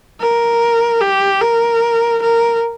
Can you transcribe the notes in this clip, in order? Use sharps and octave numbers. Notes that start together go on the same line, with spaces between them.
A#4
G4
A#4
A#4